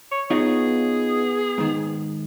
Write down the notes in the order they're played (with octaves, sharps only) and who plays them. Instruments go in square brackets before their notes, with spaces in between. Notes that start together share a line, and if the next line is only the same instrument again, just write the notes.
[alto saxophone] C#5
[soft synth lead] B3 [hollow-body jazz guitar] D#4 F4 C#5 [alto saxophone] G#4
[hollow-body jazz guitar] G#2 D#3